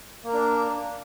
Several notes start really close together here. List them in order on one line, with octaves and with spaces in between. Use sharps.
A#3 A#4 D4